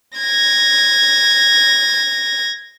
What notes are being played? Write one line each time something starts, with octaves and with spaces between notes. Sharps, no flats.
G#6 A#6